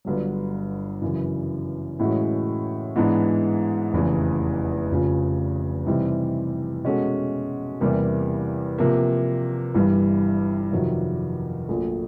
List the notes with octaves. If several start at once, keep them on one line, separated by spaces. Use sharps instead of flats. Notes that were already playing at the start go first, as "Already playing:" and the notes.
G1 G2 D3 F#3
F#2 C#3 E3
A2 E3 G#3 C#4 F#4
G#2 E3 G#3 B3 D4
F1 E2 C#3 E3
F1 F2 C#3 F3
C3 E3 G3 C4 D#4
B2 G#3 C#4 F#4 A4
E2 C3 E3 G3 A#3
C3 F3 A#3
G1 G2 E3 G3
F2 C3 D#3 F#3
A#1 A#2 F#3 A3